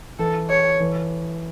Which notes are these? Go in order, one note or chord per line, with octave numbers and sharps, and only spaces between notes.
E3 A4
C#5
E3